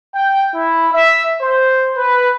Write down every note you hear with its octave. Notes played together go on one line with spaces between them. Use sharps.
G5
E4
E5
C5
B4